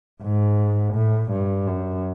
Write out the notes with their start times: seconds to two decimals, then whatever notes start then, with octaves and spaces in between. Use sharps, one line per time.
0.22 G#2
0.94 A2
1.32 G2
1.68 F#2